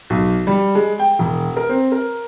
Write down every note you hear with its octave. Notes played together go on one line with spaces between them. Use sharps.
B1
G3
G#3
G5
E1
A#4
C4
A#4